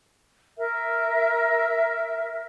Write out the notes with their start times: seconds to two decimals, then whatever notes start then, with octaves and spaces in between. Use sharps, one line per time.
0.58 A#4 E5